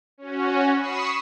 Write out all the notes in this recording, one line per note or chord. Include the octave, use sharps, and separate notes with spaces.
C#4 F#4
B5 C#6 D#6 C7 E7